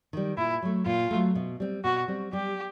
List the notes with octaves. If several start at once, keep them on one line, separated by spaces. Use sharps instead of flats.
D#3 G3
A#2 E4
F#3 A3
A#2 F4
F#3 A3
B2
G3 C4
B2 F#4
G3 C4
G3 G4